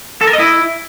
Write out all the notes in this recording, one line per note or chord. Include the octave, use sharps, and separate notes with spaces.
A4
A#4
D#5
E4